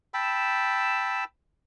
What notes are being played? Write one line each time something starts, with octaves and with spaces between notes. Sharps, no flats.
G5 A5 B5 E6